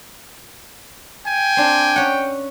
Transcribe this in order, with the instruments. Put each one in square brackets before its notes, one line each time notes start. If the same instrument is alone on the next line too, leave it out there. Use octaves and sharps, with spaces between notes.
[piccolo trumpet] G5 [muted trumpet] G#5
[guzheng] C4 D4
C#4 F#5